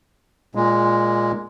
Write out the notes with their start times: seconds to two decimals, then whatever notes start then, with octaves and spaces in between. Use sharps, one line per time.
0.55 A#2 G#3